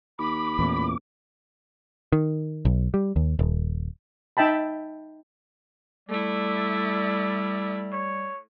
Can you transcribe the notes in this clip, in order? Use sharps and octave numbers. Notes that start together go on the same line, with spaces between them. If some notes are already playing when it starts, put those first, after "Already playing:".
D#2 B5 D6
A1 E2 A#2
D#3
B1
G3
D#2
D#1
D#4 E5 G5 A5 B5
G3 A3 E4 D5
C#5